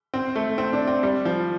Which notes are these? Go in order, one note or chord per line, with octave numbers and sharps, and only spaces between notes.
C4
A3
C4
D4
C4
G3
F3